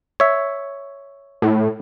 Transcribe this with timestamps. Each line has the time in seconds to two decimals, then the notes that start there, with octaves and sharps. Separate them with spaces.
0.20 C#5 E5
1.42 A2